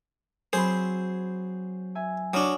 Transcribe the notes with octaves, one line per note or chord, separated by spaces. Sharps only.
F#3 C4 G#4 C5 B5
E5 G#5
F#3 D4 C#6 D#6 F6